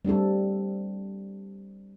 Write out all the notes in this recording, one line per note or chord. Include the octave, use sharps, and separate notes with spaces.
G3 C4 D4 A4